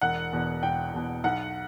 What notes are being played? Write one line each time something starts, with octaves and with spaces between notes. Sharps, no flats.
E1 F#5
E2 B2
E1 G5
E2 B2
B1 F#5